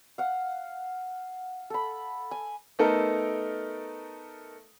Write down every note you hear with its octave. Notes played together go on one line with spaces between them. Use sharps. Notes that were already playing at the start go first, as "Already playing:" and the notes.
F5 F#5
A4 B5
G#5
A3 B3 D#4 A4 A#4